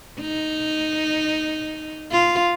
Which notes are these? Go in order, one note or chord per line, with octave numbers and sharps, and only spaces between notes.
D#4
F4